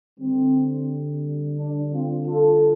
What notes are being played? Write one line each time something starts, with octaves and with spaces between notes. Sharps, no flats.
D3 G3 C4
D4
C4 F4
F4 A4